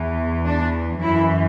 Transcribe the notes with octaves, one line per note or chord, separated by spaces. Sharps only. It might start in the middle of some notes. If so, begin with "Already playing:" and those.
Already playing: E2 E3
D4
F#2 E3 E4